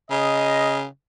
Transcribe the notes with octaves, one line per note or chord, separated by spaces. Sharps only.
C#3 D#5